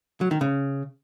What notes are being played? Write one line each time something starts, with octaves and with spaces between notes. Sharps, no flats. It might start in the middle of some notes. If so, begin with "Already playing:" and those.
F#3
D#3
C#3